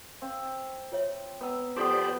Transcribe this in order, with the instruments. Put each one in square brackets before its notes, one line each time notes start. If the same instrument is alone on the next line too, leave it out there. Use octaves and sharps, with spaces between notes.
[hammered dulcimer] C4 [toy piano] F5
[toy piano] F4 C#5 E5
[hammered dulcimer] B3 [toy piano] D#5 A#5 E6
[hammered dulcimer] F3 B3 [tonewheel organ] G4 C5 D5 [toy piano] A4 D#6